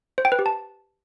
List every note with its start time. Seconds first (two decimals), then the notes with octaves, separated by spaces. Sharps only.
0.18 C5
0.25 G5
0.32 B4
0.39 G4
0.46 A5